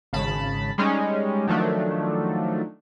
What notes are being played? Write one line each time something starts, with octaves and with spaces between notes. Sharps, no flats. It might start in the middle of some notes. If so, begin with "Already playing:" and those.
G#1 C#3 A5 B5
G3 G#3 C#4 D#4
D#3 F3 F#3 A3 D4